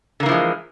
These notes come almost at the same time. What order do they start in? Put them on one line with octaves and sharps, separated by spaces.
D3 A#3 E3 F3 G#3